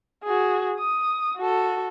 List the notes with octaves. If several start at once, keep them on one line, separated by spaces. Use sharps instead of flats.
F#4 G#4
D#6
F#4 A4